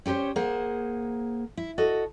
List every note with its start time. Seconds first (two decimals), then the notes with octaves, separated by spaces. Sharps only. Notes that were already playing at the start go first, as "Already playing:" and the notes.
0.06 C#4 G4 A#4 C5 C#5
0.36 A#3 G#4 C5 F#5
1.57 E4
1.78 F#4 A4 D#5